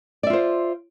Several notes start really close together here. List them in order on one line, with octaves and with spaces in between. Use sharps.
D5 E5 F4 C5